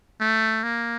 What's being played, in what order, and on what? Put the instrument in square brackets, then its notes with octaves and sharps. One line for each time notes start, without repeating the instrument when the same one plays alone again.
[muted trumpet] A3
A#3